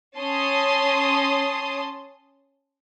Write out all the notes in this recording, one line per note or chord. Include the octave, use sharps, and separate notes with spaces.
C#4 A5 C6 D#6